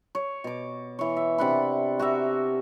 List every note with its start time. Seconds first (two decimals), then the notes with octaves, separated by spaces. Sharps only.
0.15 C#5
0.44 B2 D6
0.99 E3 C#5
1.17 E5
1.38 C3 D4 F#5 B5
1.99 F#4 G4 A#4 E5